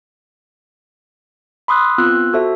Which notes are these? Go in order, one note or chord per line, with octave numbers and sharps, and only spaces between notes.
B5 C6 D#6 E6 F#6
B3 C4 F4 E6 F#6
F#4 A4 C5 E5